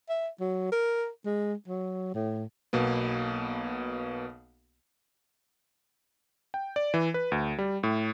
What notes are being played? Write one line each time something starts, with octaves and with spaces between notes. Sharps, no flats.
E5
F#3
A#4
G#3
F#3
A2
B1 B2 A#3 B3
G5
D5
E3
B4
D2
G3
A2